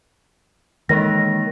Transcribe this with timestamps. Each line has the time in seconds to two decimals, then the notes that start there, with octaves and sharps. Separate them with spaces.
0.89 D#3 E3 G#3 A#3 A#6